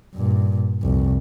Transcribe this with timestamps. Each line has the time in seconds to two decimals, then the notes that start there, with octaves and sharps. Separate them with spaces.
0.15 G2 A#2
0.82 F1 C2